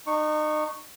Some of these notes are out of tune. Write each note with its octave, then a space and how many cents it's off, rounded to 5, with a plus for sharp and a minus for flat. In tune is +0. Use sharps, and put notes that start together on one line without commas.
D#4 -35 C#6 +0